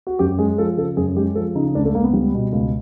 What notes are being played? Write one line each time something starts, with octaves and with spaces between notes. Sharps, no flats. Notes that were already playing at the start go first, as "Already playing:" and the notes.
F#4
F#2 G4
G#3 G#4
F3 A4
C#3 A4
F#2 G#4
G#3 G4
F3 A4
C#3 D#4
D#4
C#2 D4
A3
C#2 A#3
B3
G3
B2
C#2